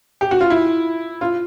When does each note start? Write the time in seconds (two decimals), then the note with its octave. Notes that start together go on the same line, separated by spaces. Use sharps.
0.21 G4
0.31 F#4
0.41 F4
0.50 E4
1.21 F4